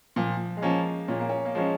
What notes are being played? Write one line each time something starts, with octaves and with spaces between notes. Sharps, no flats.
A#2 F3
G#3
F3 A#3 C#4
A#2 C#4
A#3
C#4
A#3
F3 G#3 C#4